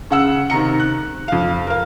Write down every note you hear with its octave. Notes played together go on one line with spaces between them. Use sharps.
C#3 F#5 E6
C3 D#3 A#5 C#7
F#6
F2 F5
A#4 F5